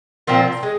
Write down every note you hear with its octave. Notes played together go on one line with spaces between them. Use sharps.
A#2 F3 C4
G#3